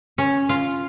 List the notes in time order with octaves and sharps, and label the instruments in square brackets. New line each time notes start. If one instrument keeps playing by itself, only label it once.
[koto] C#4
F4